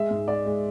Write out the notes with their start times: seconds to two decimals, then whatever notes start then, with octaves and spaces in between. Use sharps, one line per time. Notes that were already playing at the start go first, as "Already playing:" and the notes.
Already playing: G#3 E5
0.10 G#2
0.28 G#3 D5
0.46 G#3